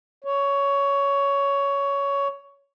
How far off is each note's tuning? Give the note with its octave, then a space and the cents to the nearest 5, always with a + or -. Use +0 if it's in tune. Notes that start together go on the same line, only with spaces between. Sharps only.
C#5 +15